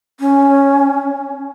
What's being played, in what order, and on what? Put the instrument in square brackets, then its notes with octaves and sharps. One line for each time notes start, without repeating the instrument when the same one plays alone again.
[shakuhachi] C#4